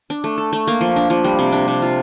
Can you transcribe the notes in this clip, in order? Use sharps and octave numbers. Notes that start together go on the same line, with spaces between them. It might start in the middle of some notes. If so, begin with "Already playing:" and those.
D4
A3
A4
A3
A#3
F3
D4
F3
G3
C3
D4
C3
F4